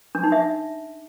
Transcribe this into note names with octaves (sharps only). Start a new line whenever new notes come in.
D4
D#4
E5